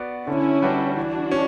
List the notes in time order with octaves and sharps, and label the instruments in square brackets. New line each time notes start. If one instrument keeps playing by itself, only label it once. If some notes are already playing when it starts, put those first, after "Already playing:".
Already playing: [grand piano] B3 F#4 B4 D5
[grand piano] D3 [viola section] C#4 E4
[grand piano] G3 D4 F#4 B4
[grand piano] E3 [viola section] D4 F#4
[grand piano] C#4